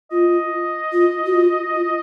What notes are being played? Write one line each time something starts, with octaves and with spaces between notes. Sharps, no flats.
F4 D#5
F4
F#4
F4
F4